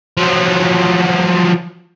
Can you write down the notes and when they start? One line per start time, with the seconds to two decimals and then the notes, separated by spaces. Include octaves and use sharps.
0.17 F3 F#3